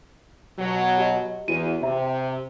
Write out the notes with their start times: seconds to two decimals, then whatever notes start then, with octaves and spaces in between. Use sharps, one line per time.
0.59 B2 F#3
0.98 G4 D#5
1.48 E2 E4 F#4 D#7
1.83 C3 E5 A#5